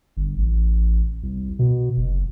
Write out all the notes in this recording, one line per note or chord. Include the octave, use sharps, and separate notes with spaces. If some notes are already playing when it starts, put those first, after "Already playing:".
G1
A1
C2
B2
F#1